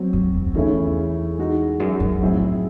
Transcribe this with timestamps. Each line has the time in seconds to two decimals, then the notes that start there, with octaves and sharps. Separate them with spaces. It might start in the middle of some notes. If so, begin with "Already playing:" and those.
Already playing: F#3 C4 F#4
0.13 F#2
0.34 E2
0.54 E2 C#3 E3 A3 C#4 E4
1.38 G#3 D#4 F#4
1.80 F#2
2.00 F#2
2.21 A2 F#3 C4 E4 G#4